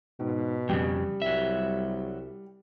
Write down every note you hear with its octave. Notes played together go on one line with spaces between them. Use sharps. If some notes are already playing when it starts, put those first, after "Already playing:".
G#2 B2
F2 A2 C#3 G3
C2 F#3 E5